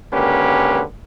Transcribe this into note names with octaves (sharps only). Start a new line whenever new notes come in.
G#1 D3 A#3 C#4 G4 B4